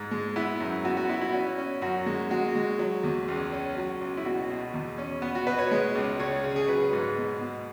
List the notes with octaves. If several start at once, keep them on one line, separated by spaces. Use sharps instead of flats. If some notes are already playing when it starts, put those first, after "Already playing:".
Already playing: G#2 G#3
G#3
B3 E4
F#2
B3 F#4
F#4
B3 E4
E4
C#4 F#4
C#4
F#2 F#4
G#3
G#3 F#4
G#3
F#3
E2
C#2
C#4
F#3
C#2
E4
B2 F#4
B2
E2
C#4
B3
F#4
B2 B4
C#5
G#3
C#2
C#3 C#5
C#3
G#4
F#3 B4
G#2
B2
B2